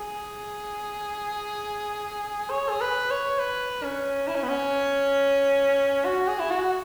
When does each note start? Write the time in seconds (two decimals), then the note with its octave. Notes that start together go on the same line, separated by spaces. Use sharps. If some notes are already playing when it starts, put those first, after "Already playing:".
Already playing: G#4
2.50 C#5
2.70 G#4
2.81 B4
3.11 C#5
3.39 B4
3.84 C#4
4.28 E4
4.35 C#4
4.43 B3
4.49 C#4
6.05 F#4
6.28 G#4
6.40 E4
6.50 F#4